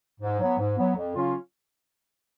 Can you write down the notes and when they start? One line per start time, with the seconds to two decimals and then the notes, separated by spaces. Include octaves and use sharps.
0.21 G#2
0.40 F#3 B3
0.58 G#2
0.78 F#3 B3
0.96 F2
1.15 C#3 F#3 C#4 F4